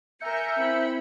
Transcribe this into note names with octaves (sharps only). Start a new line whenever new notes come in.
A#4 E5 G#5 A#5 G6 C#7
C4 E4 B5